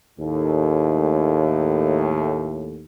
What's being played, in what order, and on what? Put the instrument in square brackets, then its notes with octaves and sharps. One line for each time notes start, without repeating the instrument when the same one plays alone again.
[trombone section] D#2 A2